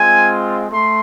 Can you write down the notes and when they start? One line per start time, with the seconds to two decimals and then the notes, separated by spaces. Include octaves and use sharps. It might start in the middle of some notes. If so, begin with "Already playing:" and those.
Already playing: G#3 C4 F4 G#5
0.72 A3 C6